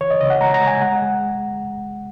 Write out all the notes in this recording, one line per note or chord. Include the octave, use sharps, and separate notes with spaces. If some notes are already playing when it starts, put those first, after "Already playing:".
E3 C#5
D#5
C#3 D#5
F#5
G#3 A#5
A#5
G#3
G#5
G#3 F#5
G#3